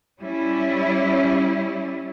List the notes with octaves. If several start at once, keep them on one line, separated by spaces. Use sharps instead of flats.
G3 C#4 E4